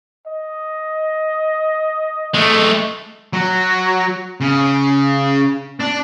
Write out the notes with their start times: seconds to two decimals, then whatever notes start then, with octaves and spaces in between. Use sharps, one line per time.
0.27 D#5
2.35 G#3 A3
3.33 F#3
4.41 C#3
5.81 D4